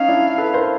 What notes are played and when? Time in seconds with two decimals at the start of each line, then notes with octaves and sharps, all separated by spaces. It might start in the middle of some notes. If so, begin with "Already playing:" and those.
Already playing: C#4 D#4 F5
0.08 D4 E4
0.38 A4 B4
0.54 A#4 C5